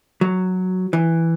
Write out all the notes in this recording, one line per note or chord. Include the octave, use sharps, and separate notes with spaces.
F#3
E3